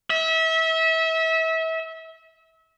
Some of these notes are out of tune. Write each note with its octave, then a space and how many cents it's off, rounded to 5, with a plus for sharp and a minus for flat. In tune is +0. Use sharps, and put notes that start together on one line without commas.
E5 -30